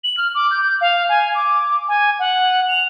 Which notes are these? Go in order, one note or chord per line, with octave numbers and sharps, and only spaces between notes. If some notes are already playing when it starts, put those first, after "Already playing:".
F#7
F6
D6
G6
F5
G#5
D6
G#5
F#5
F7